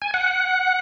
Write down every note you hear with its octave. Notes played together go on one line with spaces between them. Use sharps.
G#5
F#5